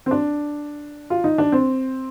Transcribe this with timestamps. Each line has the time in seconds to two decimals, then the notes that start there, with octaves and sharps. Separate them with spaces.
0.06 C4
0.11 D4
1.10 F4
1.24 D#4
1.38 D4
1.52 C4